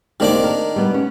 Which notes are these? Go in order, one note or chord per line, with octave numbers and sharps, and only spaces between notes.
D#3 A#3 C4 D4 G4 D6
A#4
G3 B3
C#4